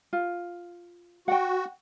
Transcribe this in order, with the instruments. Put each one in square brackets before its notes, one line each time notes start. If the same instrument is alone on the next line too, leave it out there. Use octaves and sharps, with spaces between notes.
[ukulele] F4
[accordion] F#4 [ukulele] F#5 G5